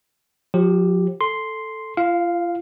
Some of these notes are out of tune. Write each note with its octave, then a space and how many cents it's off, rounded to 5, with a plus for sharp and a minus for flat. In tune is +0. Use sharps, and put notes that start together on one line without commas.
F3 +45 G4 +0
A4 +0 C6 +0
F4 -35 F5 +0